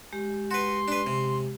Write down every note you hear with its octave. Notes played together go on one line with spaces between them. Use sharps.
G#3 G4
F#4 B4 C6
D4 B4
C3